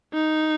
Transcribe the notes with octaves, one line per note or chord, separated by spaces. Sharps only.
D#4